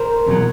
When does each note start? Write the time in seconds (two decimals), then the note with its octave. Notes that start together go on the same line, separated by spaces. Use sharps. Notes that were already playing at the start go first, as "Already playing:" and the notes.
Already playing: A#4 C5
0.26 E2 B2 F#3